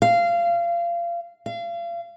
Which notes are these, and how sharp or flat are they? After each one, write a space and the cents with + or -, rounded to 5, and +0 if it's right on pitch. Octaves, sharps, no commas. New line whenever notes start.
F5 -25
F5 -35